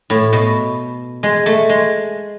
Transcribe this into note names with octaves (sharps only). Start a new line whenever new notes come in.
A2
B2
G#3
A3
G#3